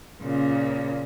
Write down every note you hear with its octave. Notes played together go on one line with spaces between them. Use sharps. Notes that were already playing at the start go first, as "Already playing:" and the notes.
A#2 C#3